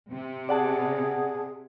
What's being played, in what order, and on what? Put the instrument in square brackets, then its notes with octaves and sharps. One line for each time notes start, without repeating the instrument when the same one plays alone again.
[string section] C3
[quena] G#4 [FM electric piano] D5 F#5 A5